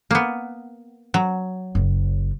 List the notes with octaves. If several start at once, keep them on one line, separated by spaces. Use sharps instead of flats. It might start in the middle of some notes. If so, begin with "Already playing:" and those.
A#3 B3
F#3
F#1